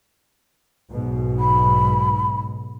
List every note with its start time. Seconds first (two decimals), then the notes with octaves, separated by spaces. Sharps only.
0.91 B1 G#2 B2
1.39 B5